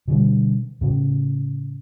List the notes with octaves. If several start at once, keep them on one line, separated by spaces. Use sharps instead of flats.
B2 D3 G3
A2 C#3